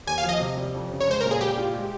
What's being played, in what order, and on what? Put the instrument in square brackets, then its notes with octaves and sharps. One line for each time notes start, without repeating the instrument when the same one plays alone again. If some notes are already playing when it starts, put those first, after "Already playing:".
[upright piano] D#2 [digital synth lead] G#5
[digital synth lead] F5
[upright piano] F3
[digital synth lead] D#5
[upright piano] C3
G3
F2
C#3
[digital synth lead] C#5
[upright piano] G#3 [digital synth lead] C5
[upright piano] A#2 [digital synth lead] A#4
[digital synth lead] G#4
[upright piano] G3 [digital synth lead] G4
[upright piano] F4
G#3